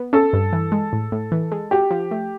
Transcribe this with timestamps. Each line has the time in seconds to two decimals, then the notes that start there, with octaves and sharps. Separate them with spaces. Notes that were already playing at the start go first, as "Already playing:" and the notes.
Already playing: B3
0.13 C#4 A4
0.33 G2
0.53 E3
0.72 G#3
0.93 A2
1.12 A2
1.32 E3
1.52 G#3
1.71 F#4 G4
1.91 F3
2.11 A3